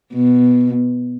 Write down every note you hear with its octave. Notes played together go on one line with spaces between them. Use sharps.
B2